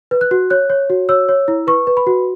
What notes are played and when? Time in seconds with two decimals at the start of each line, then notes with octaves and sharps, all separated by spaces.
0.11 B4
0.21 F#6
0.31 F#4
0.50 C#5 F#6
0.70 C#5
0.90 F#4
1.09 C#5 E6
1.29 C#5
1.48 E4
1.67 B4 C#6
1.87 B4
1.97 B5
2.07 F#4